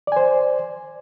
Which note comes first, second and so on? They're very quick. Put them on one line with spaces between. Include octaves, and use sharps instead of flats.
D5 G#5 C5